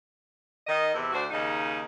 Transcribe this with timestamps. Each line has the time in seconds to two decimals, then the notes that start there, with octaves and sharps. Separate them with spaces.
0.67 D#3 D#5
0.93 E2 C3 E4
1.13 D2 D4 F#4 C5
1.31 D#2 C#3 D#4